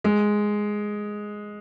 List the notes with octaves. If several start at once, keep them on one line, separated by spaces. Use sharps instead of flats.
G#3